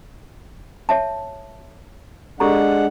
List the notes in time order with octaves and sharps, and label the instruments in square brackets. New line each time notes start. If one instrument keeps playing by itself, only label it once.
[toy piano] C#5 E5 A5
[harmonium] G#3 D4 F#5 [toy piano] G4 A4 A#5